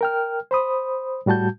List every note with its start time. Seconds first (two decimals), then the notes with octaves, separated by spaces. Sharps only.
0.01 A#4 G5 F6
0.51 C5 B5 D#6
1.26 A2 G3 F#4 A5 G6